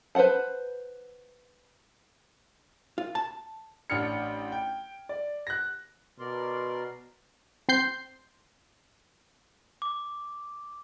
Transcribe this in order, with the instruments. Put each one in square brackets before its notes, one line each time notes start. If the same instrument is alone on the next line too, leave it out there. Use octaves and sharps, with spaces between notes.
[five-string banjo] B4 C5 D5 F#5 A5
[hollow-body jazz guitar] F4
A5
[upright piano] A1 D4 F6 C#7
G5
D5
F#6 A#6
[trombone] B2 [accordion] A#4 D5 C6
[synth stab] C4 C6 G6 C7
[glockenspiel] D6